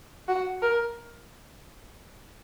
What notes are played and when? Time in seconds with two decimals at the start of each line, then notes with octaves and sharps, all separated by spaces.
0.29 F#4
0.62 A#4